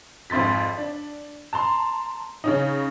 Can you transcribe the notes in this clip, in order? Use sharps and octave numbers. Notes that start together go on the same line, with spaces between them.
G#1 F2 C6 A6 B6
D4
A5 A#5 C6
C#3 C#4 D#4